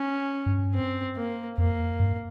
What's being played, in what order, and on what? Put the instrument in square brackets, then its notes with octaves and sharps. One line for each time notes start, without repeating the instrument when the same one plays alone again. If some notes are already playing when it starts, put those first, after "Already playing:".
Already playing: [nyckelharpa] C#4
[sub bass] G2
[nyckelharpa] C4
A#3
[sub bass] F2 [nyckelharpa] A#3
[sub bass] G2